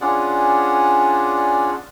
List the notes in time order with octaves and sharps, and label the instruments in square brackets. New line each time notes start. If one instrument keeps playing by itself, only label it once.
[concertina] C#4 D4 F4 G#4 D5 F#5